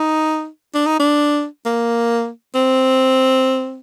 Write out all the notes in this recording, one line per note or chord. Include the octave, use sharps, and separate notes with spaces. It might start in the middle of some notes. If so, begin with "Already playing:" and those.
Already playing: D#4
D4
D#4
D4
A#3
C4